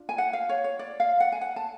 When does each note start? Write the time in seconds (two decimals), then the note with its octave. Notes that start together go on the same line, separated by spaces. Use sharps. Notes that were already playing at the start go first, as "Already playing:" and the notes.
Already playing: D4 F4
0.09 G#5
0.18 F#5
0.33 F5
0.49 C#5
0.64 C#5
0.79 D5
1.00 F5
1.20 F#5
1.32 G#5
1.41 F#5
1.56 A5